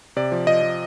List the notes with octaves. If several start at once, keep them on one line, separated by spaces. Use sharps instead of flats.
C3 D5
F3
F3 D#5
F3